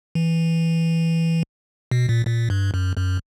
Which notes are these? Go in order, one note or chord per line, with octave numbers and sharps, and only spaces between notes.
E3
B2
A#2
A#2
G2
F#2
F#2